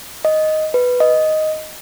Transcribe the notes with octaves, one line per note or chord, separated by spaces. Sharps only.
D#5
B4
D#5